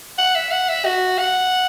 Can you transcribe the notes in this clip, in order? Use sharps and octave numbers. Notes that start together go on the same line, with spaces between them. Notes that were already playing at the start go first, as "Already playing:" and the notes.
F#5
E5
F#5
E5
F#4
F#5